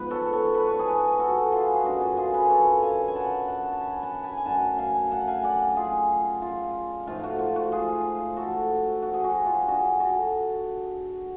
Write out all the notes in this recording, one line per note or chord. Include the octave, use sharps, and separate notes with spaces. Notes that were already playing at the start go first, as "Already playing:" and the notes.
Already playing: G#2 F3 B3 B4 F#5
A4 C#5
A4 C#5
B4
C#5
G#4 B4
F#4 A4
F4 G#4
G#4
F#2 D3 G#3 D4 F#4
F4 G#4
F4 G#4
G#4 B4
A4 C#5
F5 G#5
G#5
F#5 A5
F#5 A5
A5
G#5 B5
F#5 A5
G#5 B5
G#5
F#2 D3 F#3 A3 F#5 A5
F5 G#5
F#5 A5
F5 G#5
D5 F#5
F4 G#4
F4
G#2 F3 A3 F4
F#4
F4
F#4
F4 G#4
F#4 A4
F#4
G#4
F#4
F4
G#4
D3 G#3 D4 F#4
F#4 A4